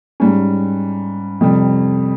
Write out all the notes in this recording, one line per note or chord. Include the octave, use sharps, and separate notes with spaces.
G#2 G3 C#4
F2 C3 G3